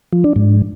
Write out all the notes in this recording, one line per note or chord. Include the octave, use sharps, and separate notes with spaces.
F3
D4
G#2